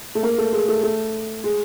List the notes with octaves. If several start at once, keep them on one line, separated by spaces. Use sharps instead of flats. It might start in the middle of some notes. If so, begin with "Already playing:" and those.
A3
A#3
A3
G#3
A3
A3
G#3